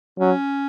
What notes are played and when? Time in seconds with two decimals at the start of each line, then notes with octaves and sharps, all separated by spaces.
0.19 F#3 C#4